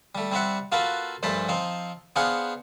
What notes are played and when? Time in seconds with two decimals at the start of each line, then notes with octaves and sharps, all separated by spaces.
0.15 G3 A3
0.32 G3 C4 D5 E5 F#5
0.72 A#3 F4 F#4 A4 B4
1.23 A#1 G2 A3 C5 A5 B5
1.49 F3 C4 D#4
2.16 B3 D4 G#4 C5 F5 F#5